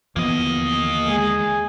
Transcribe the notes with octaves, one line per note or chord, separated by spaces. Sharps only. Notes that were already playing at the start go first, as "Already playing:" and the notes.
D#2 D3 E3 F3 A#3 B3 D#5
G#3 G#4